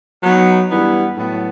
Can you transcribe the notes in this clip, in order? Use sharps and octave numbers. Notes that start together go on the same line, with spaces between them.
F#3 B3 D#4
G2 E3 G3 B3
A2 F#3 B3